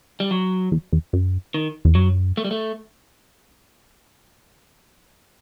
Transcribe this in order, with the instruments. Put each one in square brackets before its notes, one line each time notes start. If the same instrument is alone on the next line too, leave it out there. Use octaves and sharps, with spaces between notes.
[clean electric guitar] G3
F#3
[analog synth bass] E2
E2
F#2
[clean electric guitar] D#3
[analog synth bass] E2
[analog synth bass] F#2 [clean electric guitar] F#3
[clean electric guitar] A3
G3
A3